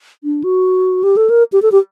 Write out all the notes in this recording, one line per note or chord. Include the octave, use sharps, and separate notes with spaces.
D4
F#4
G4
A4
A#4
G4
A4
G4